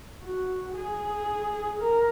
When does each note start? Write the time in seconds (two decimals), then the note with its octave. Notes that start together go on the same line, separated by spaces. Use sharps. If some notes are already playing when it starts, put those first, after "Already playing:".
0.23 F#4
0.75 G#4
1.81 A#4